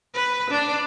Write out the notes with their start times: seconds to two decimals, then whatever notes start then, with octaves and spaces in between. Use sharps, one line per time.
0.14 B4
0.50 D4